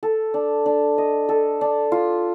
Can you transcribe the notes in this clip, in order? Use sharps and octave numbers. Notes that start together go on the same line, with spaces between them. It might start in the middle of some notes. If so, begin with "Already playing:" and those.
A4
D4
D4
D#5
A4
D4
F4